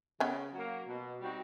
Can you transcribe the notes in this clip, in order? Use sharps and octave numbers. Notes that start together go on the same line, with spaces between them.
C#3 B3 C#4
F#3 A#3
B2
G3 C4 D#4 F#4